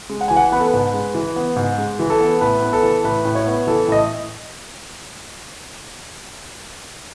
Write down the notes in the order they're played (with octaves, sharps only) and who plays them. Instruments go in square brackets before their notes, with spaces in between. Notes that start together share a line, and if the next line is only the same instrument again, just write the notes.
[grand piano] G#3
F#5
E3 G#5
F#5
B3 B4
A4
B4
G#2
G#3
E3
B3
G#2
G#3
E3
A4
B3
A2 B4
B3
A4
E3
A2 B4
A2
C#5
B3
E3 A4
A2 D#5